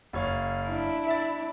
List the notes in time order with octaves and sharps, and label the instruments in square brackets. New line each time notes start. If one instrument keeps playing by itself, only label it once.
[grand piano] F#1 C#5 F5
[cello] D4 E4
[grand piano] E5 A6